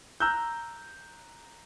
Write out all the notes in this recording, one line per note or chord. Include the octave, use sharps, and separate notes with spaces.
A#5 E6 F#6 G6